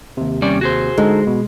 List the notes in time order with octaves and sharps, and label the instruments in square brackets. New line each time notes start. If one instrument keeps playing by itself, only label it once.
[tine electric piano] D#2 C3
[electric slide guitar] G3 C#4 D5
F#4 G#4 C5
[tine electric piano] D3 D#4 A4 [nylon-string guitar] G#3
[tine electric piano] B2